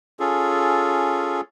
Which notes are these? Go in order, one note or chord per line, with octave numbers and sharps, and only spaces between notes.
C#4 F4 G#4 A4